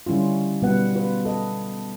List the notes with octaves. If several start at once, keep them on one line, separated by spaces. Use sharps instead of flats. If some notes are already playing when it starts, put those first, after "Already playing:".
D3 G3 C#4 E4 F4
B2 G3 B3 B4 F#5
F4 B4
A4 D#5